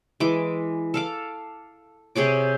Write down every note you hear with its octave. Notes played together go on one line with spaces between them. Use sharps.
E3 G#3 D6
A4 F5 D6
C3 G#4 C#5 D6